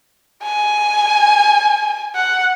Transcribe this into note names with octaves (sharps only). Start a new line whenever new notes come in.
G#5
F#5